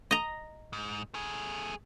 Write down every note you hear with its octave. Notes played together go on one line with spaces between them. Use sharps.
D#5 A#5
G#2
A3 G#4